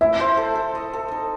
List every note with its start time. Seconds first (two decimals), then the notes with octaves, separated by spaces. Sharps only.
0.01 E4 E5
0.20 C5
0.37 A4
0.55 A4
0.75 D#5
0.93 A4
1.11 D#4